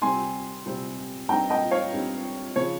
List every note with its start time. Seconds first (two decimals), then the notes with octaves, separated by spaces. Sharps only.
0.02 C3 G3 C4 G#5 C6
0.66 C3 G3 C4
1.29 G2 G3 C4 D#4 G5 A#5
1.50 D#5 G5
1.71 C#5 F5
1.93 G2 G3 C4 D#4
2.56 C#3 F3 C#5